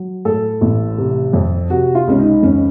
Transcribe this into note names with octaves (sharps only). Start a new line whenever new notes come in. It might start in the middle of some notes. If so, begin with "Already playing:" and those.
Already playing: F#3
A2 A4
A1
C3
F2
C3 F#4
F4
C#2 C#4
D#4
F2 C#4